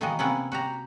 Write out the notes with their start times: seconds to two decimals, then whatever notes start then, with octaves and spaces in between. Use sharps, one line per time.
0.01 B2 D#3 E3 A#3 F#4 D#5
0.19 C3 A#3 B3 C#4 E4 F#5
0.52 F#4 G4 A#5